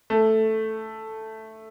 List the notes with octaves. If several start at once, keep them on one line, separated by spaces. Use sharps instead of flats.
A3